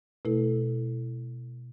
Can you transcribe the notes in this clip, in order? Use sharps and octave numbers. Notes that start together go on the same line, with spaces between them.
B2 A3 E4 A4